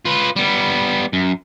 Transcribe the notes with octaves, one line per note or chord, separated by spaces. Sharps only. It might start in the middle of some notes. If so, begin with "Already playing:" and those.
F4 B4
G3 B3
F#2